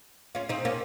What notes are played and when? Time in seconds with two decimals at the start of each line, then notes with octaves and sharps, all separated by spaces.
0.35 C#4 F4
0.49 C4 D#4
0.65 A#3 C#4